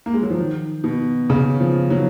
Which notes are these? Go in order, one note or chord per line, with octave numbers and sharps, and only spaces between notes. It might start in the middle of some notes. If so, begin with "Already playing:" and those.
A#3
G#3
F#3
F3
D#3
B2
C#3
F3
F#3